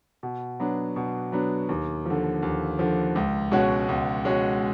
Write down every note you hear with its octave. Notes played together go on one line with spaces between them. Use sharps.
B2
F#3 B3 D4
B2
F#3 B3 D4
D#2
D3 F3
D#2
D3 F3
C#2
B2 G#3 C#4 F#4
C#2
B2 G#3 C#4 F#4